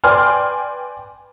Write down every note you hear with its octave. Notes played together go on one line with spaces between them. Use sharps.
B4 D5 G5 G#5 C6 F6